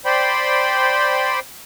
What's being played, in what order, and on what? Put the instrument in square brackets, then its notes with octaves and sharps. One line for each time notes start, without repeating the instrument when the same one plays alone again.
[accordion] C5 D5 G5 B5 C6